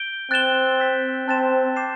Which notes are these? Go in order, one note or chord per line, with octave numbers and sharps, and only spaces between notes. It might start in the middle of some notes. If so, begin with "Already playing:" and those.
Already playing: G6 D7 G7
C4 F#6 A6 E7 G7
E6 G6 B6
C4 A5 C6 F#6 A6 E7
D6 G6 C7 E7